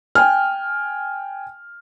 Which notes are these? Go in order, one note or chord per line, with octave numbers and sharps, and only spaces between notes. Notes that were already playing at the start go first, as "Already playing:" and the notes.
G5 G#5 F6